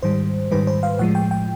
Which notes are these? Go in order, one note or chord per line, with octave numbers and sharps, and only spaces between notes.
G#2 D#3 G3 C5
G#2 D#3 G3 B4
C5
F5
A2 F3 G#3 F#5
G5
G5